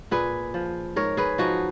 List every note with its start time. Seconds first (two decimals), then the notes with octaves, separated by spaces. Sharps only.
0.11 A#2 G#4 B4
0.54 F3
0.96 G#2 A#4 C#5
1.17 G#4 B4
1.38 F3 D#4 F#4